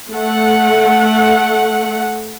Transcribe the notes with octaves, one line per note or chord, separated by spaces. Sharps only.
A3 F#5